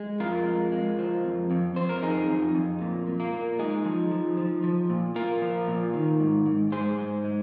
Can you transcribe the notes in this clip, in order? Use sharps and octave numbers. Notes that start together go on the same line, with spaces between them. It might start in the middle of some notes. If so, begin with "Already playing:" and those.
Already playing: G#3
F2 F4 A#4
G#3
G#3
F3
F2
F2
F2 C5
A#4
F2 D#4 G#4
F2
F2
A#2
A#2
A#3
A#2
G#3 D#4 G#4
F3
F3
F3
F3
A#2
A#2 F4 A#4
F3
A#2
D#3
G#2
G#2
G#2 G#4 C5
G#2
G#3